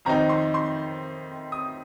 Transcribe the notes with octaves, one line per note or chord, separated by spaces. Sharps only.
F2 D#3 C4 D#4 A#5
C6
C6
D#6